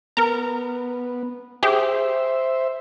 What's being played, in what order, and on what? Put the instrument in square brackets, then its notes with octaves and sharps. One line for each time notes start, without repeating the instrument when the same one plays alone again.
[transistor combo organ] B3 [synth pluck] A#4 A#5
[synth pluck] G4 G#4 [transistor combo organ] C5 E5